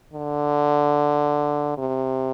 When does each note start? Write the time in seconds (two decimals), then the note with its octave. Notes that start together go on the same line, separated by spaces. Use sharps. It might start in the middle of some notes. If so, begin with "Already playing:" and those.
0.13 D3
1.78 C3